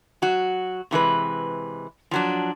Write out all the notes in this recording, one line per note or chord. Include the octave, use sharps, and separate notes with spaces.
F#3 F#4
C3 E3 G#3 B4
F3 F#3 D4